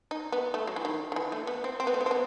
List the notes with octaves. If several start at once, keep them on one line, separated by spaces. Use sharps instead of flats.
D#4
B3
A3
F#3
E3
D#3
D#3
E3
A3
B3
C4
C4
B3
A3
B3
C4
B3